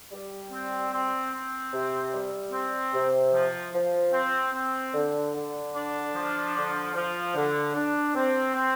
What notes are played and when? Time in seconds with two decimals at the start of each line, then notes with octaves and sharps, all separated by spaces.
0.12 G3
0.52 C4
0.92 C4
1.32 C4
1.73 C3
2.13 G3
2.52 C4
2.93 C3
3.34 F3
3.73 F3
4.13 C4
4.53 C4
4.94 D3
5.34 D3
5.74 D4
6.14 F3
6.55 D3
6.94 F3
7.35 D3
7.75 D4
8.15 C4
8.55 C4